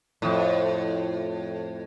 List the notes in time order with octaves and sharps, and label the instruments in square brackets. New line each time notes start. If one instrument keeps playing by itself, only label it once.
[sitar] F2 A2